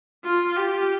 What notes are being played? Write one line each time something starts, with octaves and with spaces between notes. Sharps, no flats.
F4
G4